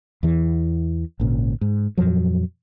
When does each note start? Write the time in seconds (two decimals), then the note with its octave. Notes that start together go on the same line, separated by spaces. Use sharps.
0.23 E2 E3
1.20 G#1 A#2 C#3
1.61 G#2
1.98 F2 A#2 F3 F#3